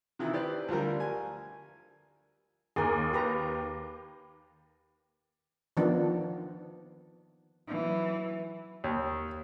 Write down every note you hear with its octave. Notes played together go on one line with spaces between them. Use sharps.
C3 D#3 E3 E4
G4 B4 C5 D5
D2 F3 G3 A#4
G#5
D#2 G#4 A#4
G4 B4 A#5
D#3 F3 B3 D4
E3 F#3
D#2